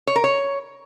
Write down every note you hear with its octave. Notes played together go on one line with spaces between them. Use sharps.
C#5
A#4
C#5